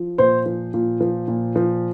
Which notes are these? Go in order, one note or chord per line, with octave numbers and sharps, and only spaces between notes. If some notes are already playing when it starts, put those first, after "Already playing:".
Already playing: F3
A#2 C5
F3
A#2
F3
A#2
F3